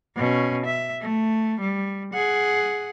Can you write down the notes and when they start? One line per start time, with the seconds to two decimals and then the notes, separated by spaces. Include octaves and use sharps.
0.16 B2 C#4
0.66 E5
1.01 A3
1.60 G3
2.14 G#4 F#5